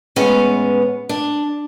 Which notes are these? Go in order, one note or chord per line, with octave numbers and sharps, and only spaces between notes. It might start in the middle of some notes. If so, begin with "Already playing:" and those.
A2 E3 G#3 B3 C#4
D4